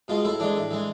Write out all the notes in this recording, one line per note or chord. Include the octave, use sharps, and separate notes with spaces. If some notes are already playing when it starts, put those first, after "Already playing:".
B2 G#3 F4
A2 E4
E3 G#3 D4
A2
E3 G#3